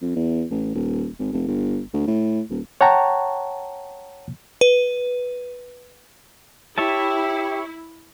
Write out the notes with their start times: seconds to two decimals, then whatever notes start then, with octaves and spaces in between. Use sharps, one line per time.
0.02 F2
0.16 E2
0.51 A1
0.75 D#1
1.19 G#1
1.33 F1
1.48 G1
1.93 D2
2.07 A2
2.50 D#1
2.81 C#5 F#5 G5 A5 A#5 C#6
4.61 B4
6.78 E4 G4 C#5 E5 A5